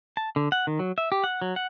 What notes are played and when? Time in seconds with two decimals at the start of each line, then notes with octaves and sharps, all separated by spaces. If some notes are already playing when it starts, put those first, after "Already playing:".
0.17 A5
0.36 D3
0.52 F#5
0.67 D#3
0.79 F#3
0.98 E5
1.12 G4
1.24 F#5
1.42 F#3
1.56 F#5